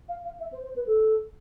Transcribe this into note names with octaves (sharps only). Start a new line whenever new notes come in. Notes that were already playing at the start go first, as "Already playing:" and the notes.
F5
F5
E5
C5
C5
B4
A4